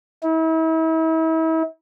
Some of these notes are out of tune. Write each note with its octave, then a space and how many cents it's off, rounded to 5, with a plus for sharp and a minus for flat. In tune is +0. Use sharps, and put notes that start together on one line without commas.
E4 -40